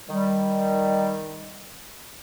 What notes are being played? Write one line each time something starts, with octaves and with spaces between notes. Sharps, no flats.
D#3 G3